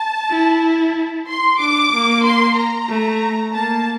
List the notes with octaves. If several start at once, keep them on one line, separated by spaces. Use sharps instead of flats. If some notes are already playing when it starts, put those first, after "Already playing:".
Already playing: A5
E4
C6
D4 D6
A#3
C6
A#5
A3
A#3 A5